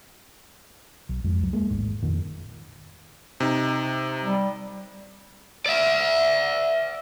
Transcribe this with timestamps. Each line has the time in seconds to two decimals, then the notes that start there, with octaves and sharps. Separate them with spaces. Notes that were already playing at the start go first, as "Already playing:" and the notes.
1.09 B1
1.24 G#1 F2 G#3
1.41 C#2 F#3
1.53 G#3 A#3
1.70 A1 D#2 G#2
2.03 F2 A#2 D#3
3.40 C3 D#4
4.24 G3
5.66 D5 E5